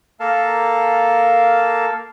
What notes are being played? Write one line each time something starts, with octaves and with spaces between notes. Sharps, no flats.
A#3 A4 A#4 F5 A5